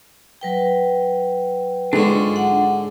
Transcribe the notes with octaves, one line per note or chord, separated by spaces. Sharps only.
F#3 B4 G5
G#2 D3 D4 F4 C#6
F#5